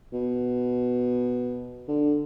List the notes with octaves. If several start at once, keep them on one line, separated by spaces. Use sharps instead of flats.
B2
D3